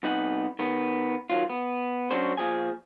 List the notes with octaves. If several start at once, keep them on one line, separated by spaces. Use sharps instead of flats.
C2 B3 D#4 F#5
D#3 B3
D#3 F#3 F4
B3
F#3 C#4 D4 F#4 C5
A#2 E3 F3 G#4 G#5